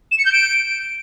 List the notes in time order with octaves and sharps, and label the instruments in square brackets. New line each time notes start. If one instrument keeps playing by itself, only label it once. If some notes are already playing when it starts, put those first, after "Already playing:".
[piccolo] E7
C#7
G6
D7